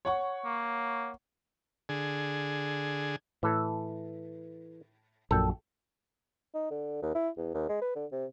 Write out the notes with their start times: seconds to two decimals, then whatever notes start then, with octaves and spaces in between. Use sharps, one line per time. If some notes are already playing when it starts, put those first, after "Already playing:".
0.05 C#5 F#5 C#6
0.45 A#3
1.89 D3 G#4
3.43 A2 E3 A4
5.31 A#1 F#2 A#2 A4 G5
6.55 D#4
6.71 D3
7.02 D#2
7.15 E4
7.38 E2
7.54 D#2
7.69 G#3
7.82 B4
7.95 D3
8.12 C3